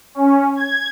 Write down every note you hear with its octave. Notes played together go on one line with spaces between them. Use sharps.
C#4
G#6